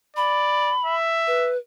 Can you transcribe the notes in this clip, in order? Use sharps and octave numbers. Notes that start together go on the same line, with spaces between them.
D5 B5
E5
B4